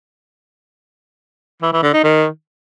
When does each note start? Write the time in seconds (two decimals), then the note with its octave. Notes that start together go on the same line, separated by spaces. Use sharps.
1.62 E3
1.73 E3
1.83 D3
1.93 D#4
2.03 D#3